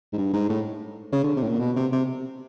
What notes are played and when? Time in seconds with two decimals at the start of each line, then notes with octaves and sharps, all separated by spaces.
0.13 G#2
0.18 G2
0.34 G#2
0.49 A2
1.12 C#3
1.24 D3
1.37 C3
1.43 A2
1.49 A#2
1.60 B2
1.76 C3
1.92 C3